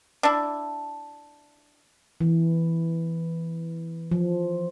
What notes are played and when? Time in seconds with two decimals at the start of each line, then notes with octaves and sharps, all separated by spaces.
0.23 D4 E4
2.21 E3
4.11 F3